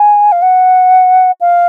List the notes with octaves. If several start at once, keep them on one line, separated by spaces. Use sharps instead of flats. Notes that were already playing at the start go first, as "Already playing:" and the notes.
Already playing: G#5
F5
F#5
F5